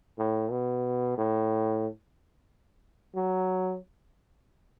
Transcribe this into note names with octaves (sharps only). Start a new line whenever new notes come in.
A2
B2
A2
F#3